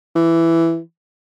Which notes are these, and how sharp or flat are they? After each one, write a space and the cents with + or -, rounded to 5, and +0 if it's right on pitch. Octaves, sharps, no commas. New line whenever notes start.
E3 +10